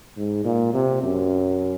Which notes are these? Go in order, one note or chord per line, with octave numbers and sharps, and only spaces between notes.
G#2
A#2
C3
F#2